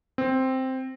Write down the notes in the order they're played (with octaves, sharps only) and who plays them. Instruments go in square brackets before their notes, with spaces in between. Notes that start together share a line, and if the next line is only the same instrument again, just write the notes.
[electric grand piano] C4